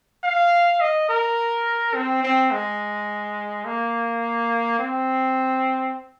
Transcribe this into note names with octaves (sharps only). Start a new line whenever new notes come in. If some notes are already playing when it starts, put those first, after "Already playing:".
F5
D#5
A#4
C4
C4
G#3
A#3
C4